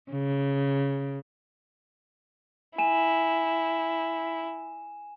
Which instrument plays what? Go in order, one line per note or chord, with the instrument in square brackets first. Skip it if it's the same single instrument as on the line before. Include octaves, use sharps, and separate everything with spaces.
[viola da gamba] C#3
[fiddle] E4 [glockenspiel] G#5 E7